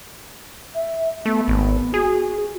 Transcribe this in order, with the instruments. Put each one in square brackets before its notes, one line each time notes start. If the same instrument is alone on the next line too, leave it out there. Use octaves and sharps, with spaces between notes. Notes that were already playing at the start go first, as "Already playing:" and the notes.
[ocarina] E5
[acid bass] A3 [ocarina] B3
[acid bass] G#1
[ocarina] F#4 [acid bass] G#4